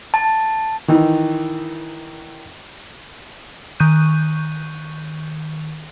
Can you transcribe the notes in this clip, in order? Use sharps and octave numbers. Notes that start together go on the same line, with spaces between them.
A5
D#3 E3
D#3 C#6 F#6 G6 D#7